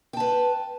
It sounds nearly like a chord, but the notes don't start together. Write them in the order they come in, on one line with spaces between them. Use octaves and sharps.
G5 A5 B4